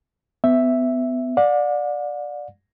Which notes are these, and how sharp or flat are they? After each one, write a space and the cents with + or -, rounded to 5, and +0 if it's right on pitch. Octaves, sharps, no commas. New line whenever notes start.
B3 +30 E5 +0
D5 +5 F#5 -45